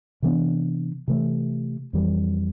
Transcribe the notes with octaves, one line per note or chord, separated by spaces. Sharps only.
C3 E3 B3 D4
C3 E3 A3
F2 E3 G3